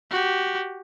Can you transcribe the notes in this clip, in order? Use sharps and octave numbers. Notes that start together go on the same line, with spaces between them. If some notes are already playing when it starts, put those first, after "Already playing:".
F#4 G4